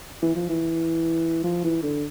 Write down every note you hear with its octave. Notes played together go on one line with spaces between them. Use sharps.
E3
F3
E3
F3
E3
D3